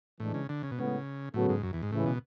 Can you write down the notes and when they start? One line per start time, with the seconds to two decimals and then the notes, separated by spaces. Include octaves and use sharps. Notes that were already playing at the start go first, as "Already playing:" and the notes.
0.20 A2 E3 G#3 D4
0.34 C#3
0.49 D3
0.63 C#3
0.71 B2
0.77 A2 C#3 G#3 B3
1.34 A2 C#3 F#3 B3 F#4 A4
1.49 G#2
1.63 F#2
1.73 E2
1.83 G#2
1.92 C#2 A2 C#3 E3
2.06 B2